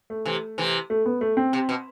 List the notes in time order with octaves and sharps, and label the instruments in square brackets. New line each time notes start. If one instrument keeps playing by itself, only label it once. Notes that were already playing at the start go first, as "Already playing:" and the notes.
[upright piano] A3
[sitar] C3 E3
C3 E3
[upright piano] A3
B3
A3
C4
[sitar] C3
B2